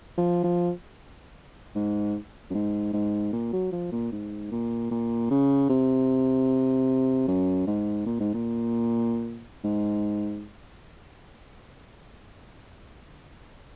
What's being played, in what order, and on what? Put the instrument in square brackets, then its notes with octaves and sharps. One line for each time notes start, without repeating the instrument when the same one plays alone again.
[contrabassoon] F3
F3
G#2
F#2
G#2
G#2
A#2
F#3
F3
A#2
G#2
A#2
A#2
C#3
C3
F#2
G#2
A#2
G#2
A#2
G#2